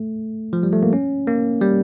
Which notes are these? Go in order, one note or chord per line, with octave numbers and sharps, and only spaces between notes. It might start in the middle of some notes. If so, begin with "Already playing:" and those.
Already playing: A3
F3
G3
A3
A#3
C#4
A#3
G3